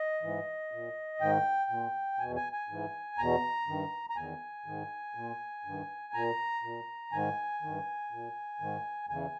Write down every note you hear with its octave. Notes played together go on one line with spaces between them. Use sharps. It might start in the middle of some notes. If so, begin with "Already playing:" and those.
Already playing: D#5
G#2 E3
A#2
G#2 D#3 G5
A#2
E2 B2 G#5
G#5
G#5
G#2 E3
E2 B2 A#5
G2 D#3
A#5
E2 D#3 G#5
G#2 D#3
A#2
G2 D#3
A#2 A#5
A#2
G#2 D#3 G#5
G2 D#3
A#2
G#2 D#3
E2 C#3 E3 G#5